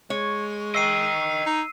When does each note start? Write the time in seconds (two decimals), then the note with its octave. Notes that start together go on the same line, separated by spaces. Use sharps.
0.10 G#3 C#5
0.75 D#5 G5 E6 C7 D#7
1.46 D#4